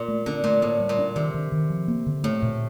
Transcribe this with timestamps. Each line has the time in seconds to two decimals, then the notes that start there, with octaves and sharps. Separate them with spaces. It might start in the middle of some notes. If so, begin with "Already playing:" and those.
Already playing: A#2
0.08 A3
0.26 D3 C4
0.44 A#2 A3
0.62 A2 A#3
0.80 G3
0.89 A#2
0.99 D4
1.16 C3 D#3
1.34 D#3
1.52 D#3
1.70 F3
1.88 A#3
2.07 D3
2.24 A2 A3
2.42 A#2